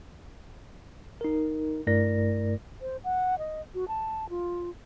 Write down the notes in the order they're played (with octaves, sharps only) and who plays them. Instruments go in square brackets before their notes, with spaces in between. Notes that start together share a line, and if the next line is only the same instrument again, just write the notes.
[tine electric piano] D#4 A#4
G2 A3 E4 A#4 D5 A#6
[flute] C5
F#5
D#5
F#4
A5
F4